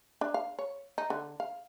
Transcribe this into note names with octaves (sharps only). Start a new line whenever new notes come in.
D4
F5
C#5
D#4
D3
F5